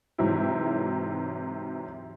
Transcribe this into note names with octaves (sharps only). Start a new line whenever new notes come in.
G#2 C3 E3 F#3 C4 E4